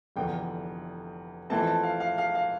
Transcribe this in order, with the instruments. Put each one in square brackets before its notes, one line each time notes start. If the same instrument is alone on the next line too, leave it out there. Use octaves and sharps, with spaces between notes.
[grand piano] F1 E2 D3 G5
F2 E3 A3 C4 A5
A5
F5
F5
F5
F5